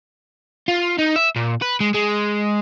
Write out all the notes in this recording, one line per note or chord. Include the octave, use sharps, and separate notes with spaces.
F4
D#4
E5
A#2
B4
G#3
G#3